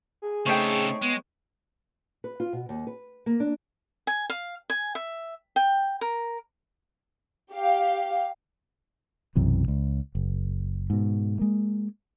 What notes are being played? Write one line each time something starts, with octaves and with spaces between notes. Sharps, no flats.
G#4
C#3 A3 C4 D#4 A4 C#5 G5
G#3 B3
B4
F4
B2
D#2
B4
A#3
D4
G#5
F5
G#5
E5
G5
A#4
G4 F5
B1 F#2 C3 E3
C#2
F#1
G#2 B2
G#3 A#3